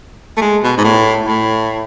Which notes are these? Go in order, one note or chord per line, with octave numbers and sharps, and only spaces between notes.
A3
G#3
B2
G#2
A2
A2